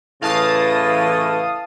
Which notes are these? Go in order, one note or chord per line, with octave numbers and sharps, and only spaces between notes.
A2 C#3 E3 F5 A5 D#6